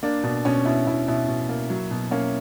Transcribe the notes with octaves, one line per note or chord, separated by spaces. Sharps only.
A#3 D4
B2 D4
B2 C#4
B2 E4
B2 E4
B2 E4
B2
A#3
F#3
B2
A#3 C#4